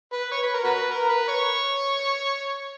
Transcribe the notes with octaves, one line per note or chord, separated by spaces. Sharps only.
B4
C#5
B4
A#4
F#4 B4
A#4
B4
C#5